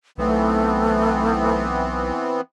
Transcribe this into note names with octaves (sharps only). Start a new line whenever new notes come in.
B1 E3 A3 B3 C4